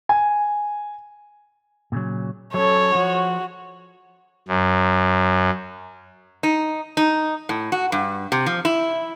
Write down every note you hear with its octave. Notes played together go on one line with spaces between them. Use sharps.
G#5
A#2 C#3 F#3
F#3 C#4 A4 C#5
F3 F#4
F#2
D#4
D#4
A2
F#4
G2
C3
F3
E4